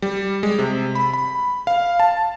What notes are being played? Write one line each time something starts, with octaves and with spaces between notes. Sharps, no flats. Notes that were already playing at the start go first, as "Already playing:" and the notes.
G3
G#3
C3
B5
B5
F5
A5